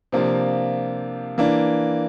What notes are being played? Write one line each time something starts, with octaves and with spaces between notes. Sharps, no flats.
C3 F3 A#3 D4 F4
E3 A#3 D4